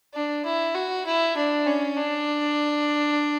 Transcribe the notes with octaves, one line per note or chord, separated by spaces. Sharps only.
D4
E4
F#4
E4
D4
C#4
D4